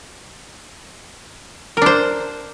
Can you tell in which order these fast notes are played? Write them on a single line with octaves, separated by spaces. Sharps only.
A#4 D4 C5